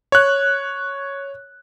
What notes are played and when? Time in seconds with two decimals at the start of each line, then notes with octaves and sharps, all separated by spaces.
0.12 C#5 F#6